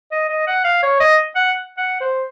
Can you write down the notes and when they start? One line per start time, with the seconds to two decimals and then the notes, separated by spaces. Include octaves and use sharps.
0.12 D#5
0.29 D#5
0.47 F#5
0.64 F5
0.83 C#5
1.00 D#5
1.36 F#5
1.77 F#5
2.01 C5